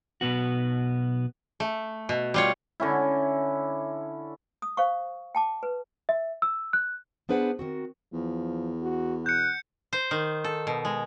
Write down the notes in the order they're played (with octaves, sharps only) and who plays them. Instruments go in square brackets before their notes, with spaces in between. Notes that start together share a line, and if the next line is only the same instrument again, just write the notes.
[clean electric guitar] B1 B2 B3 F#4
[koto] A3
B2
G3 F4 C#5
[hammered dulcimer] D3 C#4 E4
[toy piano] D#6
C5 F5 C#6
G5 A5 D6
B4
[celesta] E5
E6
F#6
[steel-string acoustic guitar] B3 D4 G#4 B4 C5 F#5
D#3 C4 F#4
[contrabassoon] E2 [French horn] F3
[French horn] F#4
[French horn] B2 [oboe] F#5 [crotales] G6 C#7
[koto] C5
D#3
A4
B2
G#3